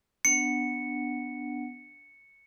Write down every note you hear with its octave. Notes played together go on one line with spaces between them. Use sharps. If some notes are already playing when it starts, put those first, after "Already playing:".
B3 D4 F#5 C#7